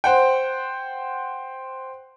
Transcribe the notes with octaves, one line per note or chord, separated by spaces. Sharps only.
C5 F#5 G5